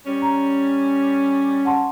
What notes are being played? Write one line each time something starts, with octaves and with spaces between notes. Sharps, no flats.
G3 C#4
A#5 A6
F#5 A5 C6